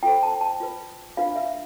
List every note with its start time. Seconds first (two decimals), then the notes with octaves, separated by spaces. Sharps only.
0.03 F4 A4 C5 G5
0.23 A5
0.41 A5
0.60 F4 B4
1.17 D4 F4 B4 F5
1.36 E5